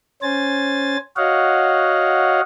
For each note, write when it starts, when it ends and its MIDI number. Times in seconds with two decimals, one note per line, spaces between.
0.22 0.97 61
0.22 0.97 72
0.22 0.97 80
0.22 0.97 93
1.17 2.41 66
1.17 2.41 73
1.17 2.41 75
1.17 2.41 77
1.17 2.41 78